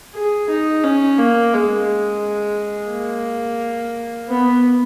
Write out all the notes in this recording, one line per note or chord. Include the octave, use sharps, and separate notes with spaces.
G#4
D#4
C#4
A#3
G#3
A#3
B3